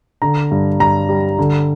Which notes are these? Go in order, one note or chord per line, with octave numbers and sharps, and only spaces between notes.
D3 A#5
G2
G2 A#5
G3
D3